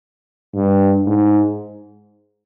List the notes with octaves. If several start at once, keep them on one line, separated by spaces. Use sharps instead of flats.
G2
G#2